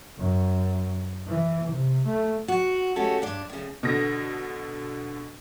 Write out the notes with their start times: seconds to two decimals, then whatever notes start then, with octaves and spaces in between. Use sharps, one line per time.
0.19 F#2
1.27 E3
1.70 C3
2.05 A3
2.48 F#4
2.96 G#3 A3 C#4 F#4 G4 A4
3.22 G2 D4
3.50 A2 C#3
3.83 B2 D3 A#6